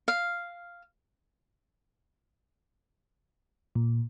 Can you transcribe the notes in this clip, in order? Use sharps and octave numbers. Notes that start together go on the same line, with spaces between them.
F5
A#2